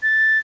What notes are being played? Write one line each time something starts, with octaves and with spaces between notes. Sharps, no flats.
A6